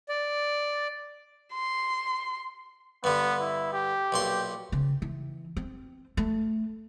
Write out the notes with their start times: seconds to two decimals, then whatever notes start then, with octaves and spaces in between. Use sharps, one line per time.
0.09 D5
1.53 C6
3.04 G2 D3 B3
3.41 E4
3.73 G4
4.12 B1 A#2 C6
4.72 C#3
5.02 E3
5.57 C4
6.17 A3